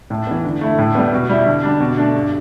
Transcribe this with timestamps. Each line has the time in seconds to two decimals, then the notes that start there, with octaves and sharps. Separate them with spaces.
0.10 A2
0.27 E3 B3
0.45 D3
0.61 A3 E4
0.78 A2
0.95 G3 B3
1.13 B2
1.29 G3 E4
1.46 D3
1.63 G3 D4
1.80 B2
1.97 A3 D4
2.14 G2